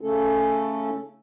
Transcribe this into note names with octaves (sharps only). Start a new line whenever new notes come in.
C#3 A3 C#4 A4